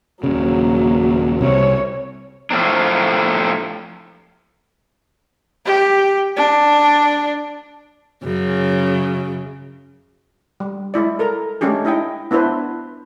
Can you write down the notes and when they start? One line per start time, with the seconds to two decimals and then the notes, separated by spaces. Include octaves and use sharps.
0.23 D#1 C#3 F#3 A#3
1.41 C2 C3 C#5
2.51 A2 F3 A3 C4 D4
5.66 G4
6.36 D4
8.24 F#2 C#3
10.60 G3
10.94 G#3 E4 D5
11.19 A4 A#4 A#5
11.61 G#3 A3 C#4 D4 G4 G#4
11.85 D#4 E4 D#5 G5
12.31 B3 D4 E4 B4 C5